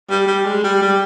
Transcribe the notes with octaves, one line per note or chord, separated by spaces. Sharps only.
G3
G3
G#3
G3
G3